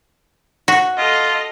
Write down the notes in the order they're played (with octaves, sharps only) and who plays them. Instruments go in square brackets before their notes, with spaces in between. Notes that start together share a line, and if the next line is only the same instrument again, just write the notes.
[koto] F#4
[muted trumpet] F4 [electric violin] A4 D#5